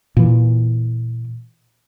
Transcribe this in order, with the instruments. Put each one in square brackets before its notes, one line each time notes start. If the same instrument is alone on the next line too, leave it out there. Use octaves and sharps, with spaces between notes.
[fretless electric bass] A#2 E3